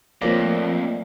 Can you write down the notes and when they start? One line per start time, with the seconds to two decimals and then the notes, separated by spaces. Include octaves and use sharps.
0.22 F2 F3 A3 A#3 C#5 D5 F5